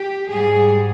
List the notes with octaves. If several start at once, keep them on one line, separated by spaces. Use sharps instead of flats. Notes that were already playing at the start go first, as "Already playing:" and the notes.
Already playing: G4
G#2 G3 G#4